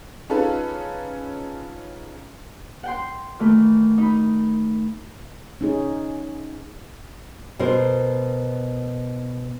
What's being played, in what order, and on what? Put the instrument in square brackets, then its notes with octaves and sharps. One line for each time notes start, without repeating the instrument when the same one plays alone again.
[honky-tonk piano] C#4 D#4 F4 G#4 A4 B4
[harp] F#5 G5 C6
D#3 E3 A3
D#4 B5
[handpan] C#4 D#4 G#4
[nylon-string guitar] B2 A#4 C5